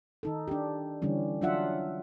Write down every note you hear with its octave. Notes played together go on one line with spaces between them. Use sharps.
D#3 D#4 A4
D4 G4
D3 E3 G3 C#4
F#3 D4 F4 E5 F#5